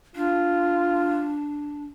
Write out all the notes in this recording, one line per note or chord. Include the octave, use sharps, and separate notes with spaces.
D4 F4